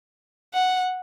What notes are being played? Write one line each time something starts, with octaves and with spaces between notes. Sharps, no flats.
F#5